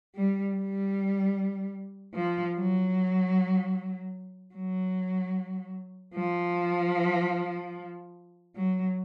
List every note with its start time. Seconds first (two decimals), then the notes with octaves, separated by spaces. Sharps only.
0.15 G3
0.55 G3
2.14 F3
2.55 F#3
4.55 F#3
6.15 F3
8.56 F#3